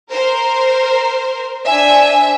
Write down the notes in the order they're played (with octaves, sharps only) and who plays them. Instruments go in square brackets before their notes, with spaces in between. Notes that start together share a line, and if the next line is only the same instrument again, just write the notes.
[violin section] A#4 C5
[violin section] D4 C5 E5 [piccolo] G#5